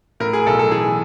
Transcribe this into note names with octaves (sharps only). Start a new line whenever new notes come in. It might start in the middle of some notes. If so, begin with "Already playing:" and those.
A2 A#4
G#4
B1 A4
A4
E3 G#4